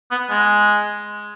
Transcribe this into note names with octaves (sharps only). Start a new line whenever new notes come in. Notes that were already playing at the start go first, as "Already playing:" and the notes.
B3
G#3